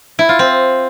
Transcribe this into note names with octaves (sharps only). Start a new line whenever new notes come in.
E4
F4
C4